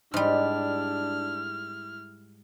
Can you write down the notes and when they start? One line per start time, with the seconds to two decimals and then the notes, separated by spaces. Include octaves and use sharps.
0.14 G#2 G3 D4 E4 F6